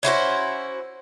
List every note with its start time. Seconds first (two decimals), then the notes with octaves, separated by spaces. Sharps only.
0.03 C#4 E4 F#4 C5